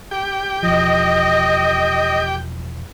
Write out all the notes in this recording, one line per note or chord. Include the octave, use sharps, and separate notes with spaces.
G4 G5
E1 F3 D#5